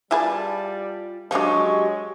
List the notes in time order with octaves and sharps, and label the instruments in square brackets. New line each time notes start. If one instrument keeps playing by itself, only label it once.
[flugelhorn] G3 [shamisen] E4 G#4 B4 [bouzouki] F4 A5
[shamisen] F3 D4 [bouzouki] F#3 D#4 G4 [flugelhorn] G#3 [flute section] C#6